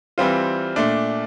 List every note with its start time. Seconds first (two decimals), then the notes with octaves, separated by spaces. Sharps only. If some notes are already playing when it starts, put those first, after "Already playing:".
0.18 E3 G3 C4 F4
0.76 A#2 A3 D4